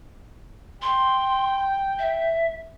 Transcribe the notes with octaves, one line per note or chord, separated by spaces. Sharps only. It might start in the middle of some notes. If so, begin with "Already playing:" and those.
G5 C6
E5